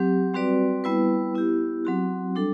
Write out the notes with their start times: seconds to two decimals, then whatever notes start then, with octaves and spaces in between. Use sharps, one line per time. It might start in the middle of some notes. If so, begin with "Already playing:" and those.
Already playing: F#3 C4 G4
0.34 G3 C4 F#4 B4 D5
0.84 G3 B3 E4 B4
1.34 B3 E4 G4
1.85 F#3 C4 F#4
2.35 G3 D4 A4